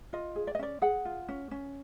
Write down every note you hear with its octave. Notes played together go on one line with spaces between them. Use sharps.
F4 D#5
G#4
D5
D#5
C#4 D5
G#4 F#5
F4
C#4
C#4